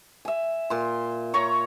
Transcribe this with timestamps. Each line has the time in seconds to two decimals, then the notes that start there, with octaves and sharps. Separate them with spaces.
0.25 E5 G#5
0.70 A#2 C6
1.34 C#5 A#5 C#6